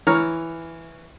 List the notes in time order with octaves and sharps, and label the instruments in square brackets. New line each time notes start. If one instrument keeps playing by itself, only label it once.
[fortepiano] E3 C#5 A#5 F6